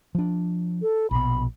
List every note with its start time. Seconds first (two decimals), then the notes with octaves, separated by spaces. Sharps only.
0.15 F3 D4
0.82 A4
1.11 A#1 B2 B5